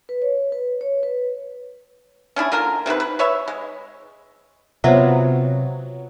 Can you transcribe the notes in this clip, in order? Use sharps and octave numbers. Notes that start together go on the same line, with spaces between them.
B4
C#5
B4
C#5
B4
C#4 D4 E4 G#4
D3 A#3 F4 A#4
C3 D#3 E3 B4
B4
B4 C#5 E5
G#3
C3 F#3 B3 F4 C5 E5